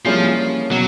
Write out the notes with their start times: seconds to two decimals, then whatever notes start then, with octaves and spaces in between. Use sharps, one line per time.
0.05 F3 G3 A#3 C#4 E4 G#4
0.71 B2 F#3